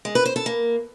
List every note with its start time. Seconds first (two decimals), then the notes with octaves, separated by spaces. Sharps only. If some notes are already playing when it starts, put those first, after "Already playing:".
0.05 G#3
0.15 B4
0.25 C5
0.36 A4
0.46 A#3